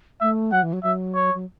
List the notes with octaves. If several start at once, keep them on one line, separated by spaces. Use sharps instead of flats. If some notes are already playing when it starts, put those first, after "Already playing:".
A3 E5
F#3 F#5
E3
F#3
F#3 E5
C#5
F#3